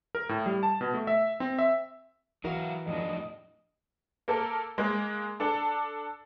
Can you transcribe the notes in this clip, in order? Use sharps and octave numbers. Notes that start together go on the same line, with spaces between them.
A#4
A2
G3
A5
B2
A3
E5
C4
E5
E3 F#3 F#4 A#4 E5 F5
F2 A2 D4 D#5
A#3 A4 A#4
G#3 A#3
D4 A4 A5